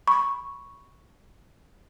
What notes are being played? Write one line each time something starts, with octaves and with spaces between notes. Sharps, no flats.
B5 C#6